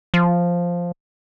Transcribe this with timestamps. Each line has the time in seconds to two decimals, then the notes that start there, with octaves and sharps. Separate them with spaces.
0.14 F3